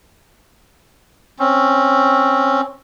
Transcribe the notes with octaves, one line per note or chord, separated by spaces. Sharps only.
C4 C#4